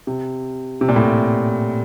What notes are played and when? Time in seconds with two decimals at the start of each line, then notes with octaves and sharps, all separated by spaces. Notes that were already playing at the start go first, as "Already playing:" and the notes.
0.07 C3
0.81 C3
0.88 A#2
0.96 A2